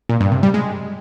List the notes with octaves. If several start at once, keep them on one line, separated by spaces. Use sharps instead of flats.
A#2
G2
C3
G3
G#3